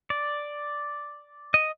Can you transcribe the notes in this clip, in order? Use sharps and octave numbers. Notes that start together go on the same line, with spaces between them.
D5
D#5